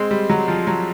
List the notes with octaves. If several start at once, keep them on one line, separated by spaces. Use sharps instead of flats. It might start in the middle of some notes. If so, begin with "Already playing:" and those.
Already playing: G#3 C4
G3
F#3
F3
F#3